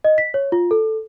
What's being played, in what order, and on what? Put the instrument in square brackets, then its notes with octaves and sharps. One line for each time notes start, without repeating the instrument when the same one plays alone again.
[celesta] D#5
B6
C#5
F4
A4